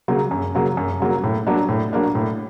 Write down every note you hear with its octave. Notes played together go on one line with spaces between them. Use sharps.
C#3 F#3 A#3
F#2
C#3 F#3 A#3
F#2
C#3 F#3 A#3
A2
F#3 A#3 D4
A2
F#3 A#3 D4
A2